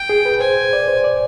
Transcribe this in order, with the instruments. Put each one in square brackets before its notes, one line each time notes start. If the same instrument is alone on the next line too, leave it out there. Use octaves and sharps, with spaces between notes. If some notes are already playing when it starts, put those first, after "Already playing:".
Already playing: [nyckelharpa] G5
[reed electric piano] G#4
B4
[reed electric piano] C5 [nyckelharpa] G#5
[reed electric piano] D5
C5
D5